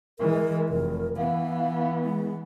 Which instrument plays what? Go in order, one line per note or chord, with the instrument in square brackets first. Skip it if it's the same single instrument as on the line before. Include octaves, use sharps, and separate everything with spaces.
[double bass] E3 G#3 [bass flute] A#4
[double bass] F1 [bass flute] A#4
[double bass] E3 B3 [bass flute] F5
[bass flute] G#3